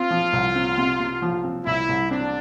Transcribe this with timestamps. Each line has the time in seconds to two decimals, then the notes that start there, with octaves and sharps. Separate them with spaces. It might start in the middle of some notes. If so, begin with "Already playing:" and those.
Already playing: C4 F4
0.11 F3
0.33 C2
0.55 C4
0.78 C3
1.00 C3
1.22 F3
1.44 C4
1.66 C2 E4
1.89 C2
2.10 C4 D4